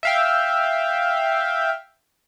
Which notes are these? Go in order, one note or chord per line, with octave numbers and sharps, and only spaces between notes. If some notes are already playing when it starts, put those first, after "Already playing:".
E5 F5 G5